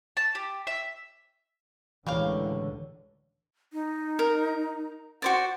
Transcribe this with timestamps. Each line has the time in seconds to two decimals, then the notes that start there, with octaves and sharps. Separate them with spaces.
0.17 A5
0.35 G4
0.67 E5
2.07 C#2 A2 D3 E3 G3 A#3 C#5 F5
3.73 D#4
4.19 A#4
5.22 F#4 C5 D5 F#5